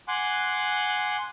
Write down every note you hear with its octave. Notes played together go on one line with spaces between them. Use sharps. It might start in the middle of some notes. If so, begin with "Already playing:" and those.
F#5 G#5 C6 D6 F#6